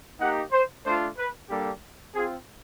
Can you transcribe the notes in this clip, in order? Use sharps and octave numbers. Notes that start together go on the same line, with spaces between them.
A#3 D#4 G4 F#5
C5
A3 D4 F4 C5
B4
G3 A#3 D4 G4 A4
C4 F4 G#4